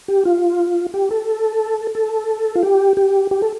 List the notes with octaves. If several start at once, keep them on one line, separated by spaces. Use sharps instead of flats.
G4
F4
G4
A4
A4
F4
G4
G4
G4
A4